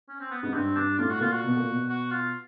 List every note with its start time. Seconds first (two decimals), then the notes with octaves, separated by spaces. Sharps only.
0.08 C#4
0.20 C4
0.31 B3
0.42 G#2 B3
0.53 G2 C4
0.76 G2 D4
0.99 A2 F4
1.10 F#4
1.20 A#2 F4
1.33 F#4
1.44 B2
1.57 A#2
1.70 B2
1.89 F#4
2.11 F4